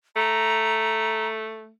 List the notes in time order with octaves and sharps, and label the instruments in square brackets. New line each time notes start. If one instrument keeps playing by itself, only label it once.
[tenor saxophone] A3 [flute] A#5